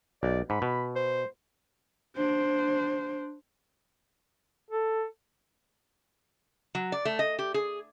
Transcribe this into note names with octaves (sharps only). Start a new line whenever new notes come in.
B1 D5
G#2 B5
B2
C5
D4 C5
A4
F#3
D5
A3
D#5
G4
G#4